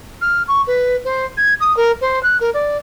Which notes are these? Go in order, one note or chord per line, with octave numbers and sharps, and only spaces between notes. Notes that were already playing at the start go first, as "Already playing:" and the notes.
F6
C#6
B4
C5
G#6
D#6
A#4
C5
F#6
A#4
D5